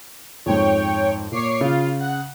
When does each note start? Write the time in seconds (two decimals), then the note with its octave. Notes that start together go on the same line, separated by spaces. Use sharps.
0.46 F2 G#2 C#5 G5
1.32 A#2 C#5 D6 C7
1.61 C#3 F4
2.00 F#5